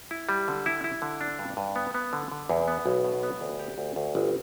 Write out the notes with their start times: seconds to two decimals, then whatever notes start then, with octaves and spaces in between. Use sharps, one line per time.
0.11 E4
0.29 G3
0.48 D3
0.66 E4
0.84 E4
1.02 D3
1.21 D4
1.39 G2
1.57 G2
1.76 B3
1.94 B3
2.13 D3
2.32 D3
2.49 E2
2.68 B3
2.86 B1
3.04 B2
3.23 B3
3.41 D2
3.59 G4
3.78 D2
3.96 D2
4.15 G1